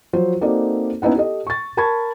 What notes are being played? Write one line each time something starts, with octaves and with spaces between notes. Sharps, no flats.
F3 F#3 C5
A#3 C4 D#4 F#4 A4 D5
B3 C#4 D#4 E4 F#5
G4 A4 D#5
C#6 A6
A#4 A5 B5 C#6 G#6